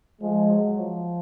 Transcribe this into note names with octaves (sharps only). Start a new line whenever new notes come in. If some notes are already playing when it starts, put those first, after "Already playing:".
F3 G#3
F#3
F3